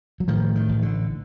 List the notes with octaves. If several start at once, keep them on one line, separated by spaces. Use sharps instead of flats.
F#3
A2 D#3 F3
D#3
A1
D3